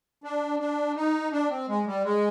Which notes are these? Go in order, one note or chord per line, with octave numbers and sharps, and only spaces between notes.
D4
D4
D#4
D4
C4
G#3
G3
G#3